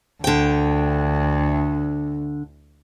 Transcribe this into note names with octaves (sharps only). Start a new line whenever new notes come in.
D2 D3 G5